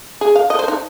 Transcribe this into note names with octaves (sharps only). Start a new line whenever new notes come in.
G#4
F5
D#5
C5
D#4